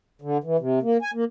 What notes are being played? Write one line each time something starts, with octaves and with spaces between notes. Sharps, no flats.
D3
E3
C3
A#3
G#5
A#3